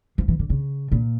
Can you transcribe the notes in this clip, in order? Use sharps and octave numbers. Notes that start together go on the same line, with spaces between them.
F3
E3
D3
C#3
A#2